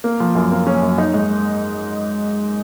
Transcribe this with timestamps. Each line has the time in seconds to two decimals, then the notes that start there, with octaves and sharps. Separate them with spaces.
0.04 A#3
0.20 F3
0.35 F#2
0.52 A#3
0.67 C#4
0.82 F#2
0.98 D#4
1.14 G#2